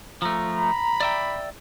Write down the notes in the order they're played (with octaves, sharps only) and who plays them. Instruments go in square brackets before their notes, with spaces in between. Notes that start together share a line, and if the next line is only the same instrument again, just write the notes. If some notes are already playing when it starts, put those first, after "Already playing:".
[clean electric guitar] F3 A3 [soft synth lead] A#5
[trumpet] B5
[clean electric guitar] D5 E5 G5